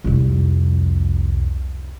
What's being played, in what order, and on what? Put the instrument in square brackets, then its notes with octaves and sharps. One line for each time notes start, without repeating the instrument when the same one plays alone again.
[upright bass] C2 F2